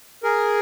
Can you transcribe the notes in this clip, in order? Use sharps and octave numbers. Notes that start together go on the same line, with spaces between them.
G#4 A#4